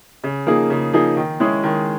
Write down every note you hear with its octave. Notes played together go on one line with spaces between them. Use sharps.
C#3
F3 A#3 D#4 G#4
C#3
F3 A#3 D#4 G#4
D#3
G#3 C#4 E4 G#4
D#3